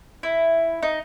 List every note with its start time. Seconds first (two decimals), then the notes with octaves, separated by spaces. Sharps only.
0.23 E4
0.83 D#4